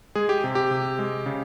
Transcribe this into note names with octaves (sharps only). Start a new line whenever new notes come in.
G#3 G#4
G4
C3
G4
C3
G#3
C#3